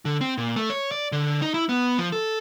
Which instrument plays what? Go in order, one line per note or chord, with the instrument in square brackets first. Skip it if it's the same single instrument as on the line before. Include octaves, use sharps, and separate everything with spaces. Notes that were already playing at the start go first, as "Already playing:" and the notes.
[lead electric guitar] D3
C4
A#2
A3
C#5
D5
D3
D#4
E4
B3
F3
A4